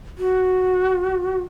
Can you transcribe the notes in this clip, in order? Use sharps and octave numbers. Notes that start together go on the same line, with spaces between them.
F#4